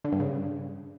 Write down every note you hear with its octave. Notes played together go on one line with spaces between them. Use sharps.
D3
G2
C#3